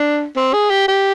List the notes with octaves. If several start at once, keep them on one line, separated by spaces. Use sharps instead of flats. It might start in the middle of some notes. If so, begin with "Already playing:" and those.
Already playing: D4
C4
G#4
G4
G4